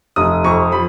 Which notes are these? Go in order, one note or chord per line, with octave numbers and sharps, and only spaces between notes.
F1 D#6
F2 C#6
F3 B5